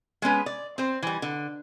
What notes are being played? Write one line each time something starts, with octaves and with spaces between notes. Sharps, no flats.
G#3 B3 C#4 B4
D5
C4 C5
E3 G3
D3